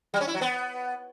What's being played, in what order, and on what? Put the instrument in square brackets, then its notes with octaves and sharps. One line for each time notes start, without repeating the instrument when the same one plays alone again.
[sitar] G3
C#4
E4
F#3
B3